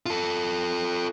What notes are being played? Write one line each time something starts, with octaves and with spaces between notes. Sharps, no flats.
F4 A4